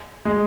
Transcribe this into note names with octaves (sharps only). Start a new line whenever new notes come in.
G#3